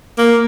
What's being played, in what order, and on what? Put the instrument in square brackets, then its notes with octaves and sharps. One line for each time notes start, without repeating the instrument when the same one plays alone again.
[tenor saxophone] A#3